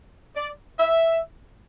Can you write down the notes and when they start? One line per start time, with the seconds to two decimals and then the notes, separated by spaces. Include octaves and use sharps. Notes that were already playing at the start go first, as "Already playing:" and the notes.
0.35 D5
0.78 E5